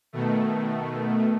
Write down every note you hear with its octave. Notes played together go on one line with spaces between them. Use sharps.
B2 D#3 A3